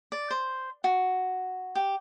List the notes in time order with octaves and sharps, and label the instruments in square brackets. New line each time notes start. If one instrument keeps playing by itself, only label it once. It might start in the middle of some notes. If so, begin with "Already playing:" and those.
[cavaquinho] D5
C5
F#4
G4